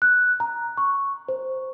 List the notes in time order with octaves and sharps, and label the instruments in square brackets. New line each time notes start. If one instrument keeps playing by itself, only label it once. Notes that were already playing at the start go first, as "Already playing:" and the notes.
[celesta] F#6
A#5
C#6
C5